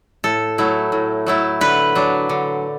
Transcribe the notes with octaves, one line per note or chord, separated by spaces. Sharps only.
A2 A4
F#3 A3 E4
A2
F#3 A3 E4
D3 B4
F#3 D4
D3